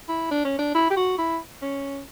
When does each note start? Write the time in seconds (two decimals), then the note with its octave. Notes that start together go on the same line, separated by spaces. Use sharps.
0.09 E4
0.31 D4
0.45 C#4
0.59 D4
0.75 E4
0.90 G4
0.97 F#4
1.18 E4
1.62 C#4